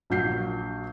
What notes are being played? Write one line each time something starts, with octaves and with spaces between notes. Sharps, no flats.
A#1 F#3 G6 C7